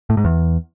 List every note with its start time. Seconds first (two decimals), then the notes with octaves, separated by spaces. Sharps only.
0.10 A2
0.17 G#2
0.25 E2